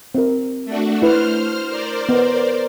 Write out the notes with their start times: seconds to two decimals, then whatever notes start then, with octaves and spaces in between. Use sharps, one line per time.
0.15 C4 A#4
0.65 A3 D4 F#4
1.02 E4 B4 C5 F6
1.67 A#4 C5 D5
2.09 B3